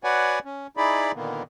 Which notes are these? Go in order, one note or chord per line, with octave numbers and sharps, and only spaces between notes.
F#4 B4 C#5 D5 F#5 G#5
C#4
D#4 E4 G#4 D5 B5
A#2 D3 D#3 A#3 B3